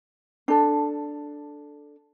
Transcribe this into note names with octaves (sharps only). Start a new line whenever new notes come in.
D4 A4